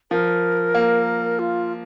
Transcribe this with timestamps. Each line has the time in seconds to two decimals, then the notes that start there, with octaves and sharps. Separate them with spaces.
0.11 F3 A#4
0.75 A#3
1.39 F4